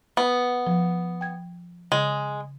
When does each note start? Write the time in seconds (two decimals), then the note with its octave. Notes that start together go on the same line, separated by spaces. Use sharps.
0.17 B3
0.67 F3
1.21 G5 G#6
1.92 C#3 G#3